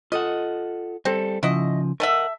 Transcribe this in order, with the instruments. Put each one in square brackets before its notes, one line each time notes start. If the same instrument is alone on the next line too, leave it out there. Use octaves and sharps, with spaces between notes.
[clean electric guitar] F4 A4 F#5 [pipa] D#5
[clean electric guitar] G3 A4 [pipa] C4
[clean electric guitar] C#3 F3 [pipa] E4 F#4 D#5
[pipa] A3 A4 E5 [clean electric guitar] A#4 D#5 F#5